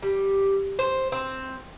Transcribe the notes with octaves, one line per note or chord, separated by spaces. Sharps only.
G3
C5
C4